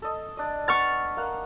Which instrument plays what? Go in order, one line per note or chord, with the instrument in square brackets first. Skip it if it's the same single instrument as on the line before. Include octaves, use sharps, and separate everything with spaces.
[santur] A4 D#5
D4 D#5
[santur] B3 B5 [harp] C#6 F6 A6
[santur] A#3 F5 F#5